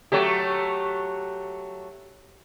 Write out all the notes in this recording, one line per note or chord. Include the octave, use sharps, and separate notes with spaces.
F#3 A3 G4